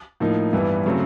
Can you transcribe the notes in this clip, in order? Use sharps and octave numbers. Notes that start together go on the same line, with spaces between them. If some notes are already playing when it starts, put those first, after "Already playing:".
A2 F3 A#3 D#4
G2 E3 G3 B3 E4
C#3 F#3 A3 C4